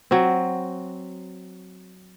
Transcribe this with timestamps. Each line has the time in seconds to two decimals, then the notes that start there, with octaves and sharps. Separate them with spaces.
0.11 F#3 C4